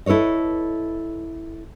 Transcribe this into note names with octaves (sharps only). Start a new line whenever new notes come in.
E4 A4 B4 C#5 D#5